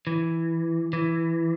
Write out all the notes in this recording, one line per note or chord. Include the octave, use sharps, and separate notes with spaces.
E3
E3